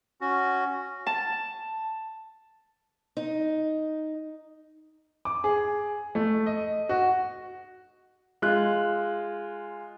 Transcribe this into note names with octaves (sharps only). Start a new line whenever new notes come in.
C#4 F#4
A5
D#4
D6
G#4
A3
D#5
F#4
G#3 F4 F#6